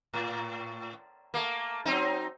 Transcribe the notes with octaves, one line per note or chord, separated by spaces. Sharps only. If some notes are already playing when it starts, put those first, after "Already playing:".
A2
A3 A#3
F#3 C4 D#4